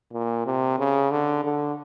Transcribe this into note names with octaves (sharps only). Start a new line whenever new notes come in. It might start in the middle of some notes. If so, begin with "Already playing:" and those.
A#2
C3
C#3
D3
D3